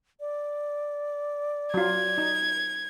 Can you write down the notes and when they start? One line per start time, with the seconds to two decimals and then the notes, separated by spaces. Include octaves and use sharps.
0.20 D5
1.74 F#3 F4 G#6
2.18 D#4